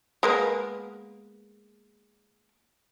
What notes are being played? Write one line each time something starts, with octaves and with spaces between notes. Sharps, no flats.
G#3 A#3 B3